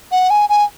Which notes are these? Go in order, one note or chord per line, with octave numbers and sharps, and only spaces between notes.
F#5
G#5
G#5